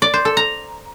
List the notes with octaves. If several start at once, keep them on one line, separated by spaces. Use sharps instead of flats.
D5
C5
A4
A#5